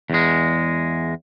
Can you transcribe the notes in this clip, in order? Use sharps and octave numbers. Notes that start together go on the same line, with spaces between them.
E2 G#3